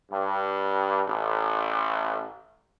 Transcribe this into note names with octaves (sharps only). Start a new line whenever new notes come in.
G2
A1